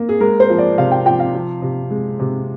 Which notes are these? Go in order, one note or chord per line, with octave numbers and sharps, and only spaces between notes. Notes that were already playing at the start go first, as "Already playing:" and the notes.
Already playing: A#3
G#4
G#3 A#4
C5
F3
D5
C3 F5
G5
F3 G5
F5
F3
C3
G#3
C3